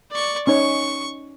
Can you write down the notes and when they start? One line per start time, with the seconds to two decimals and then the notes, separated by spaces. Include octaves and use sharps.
0.11 D5 C#6
0.47 C#4 D#4 C#5 C#6